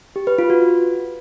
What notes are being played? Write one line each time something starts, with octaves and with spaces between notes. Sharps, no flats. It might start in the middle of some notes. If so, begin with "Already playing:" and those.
G4
B4
F4
F#4